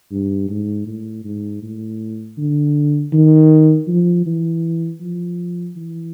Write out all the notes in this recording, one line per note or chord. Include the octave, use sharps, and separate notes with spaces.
G2
G#2
A2
G#2
A2
D3
D#3
F3
E3
F3
E3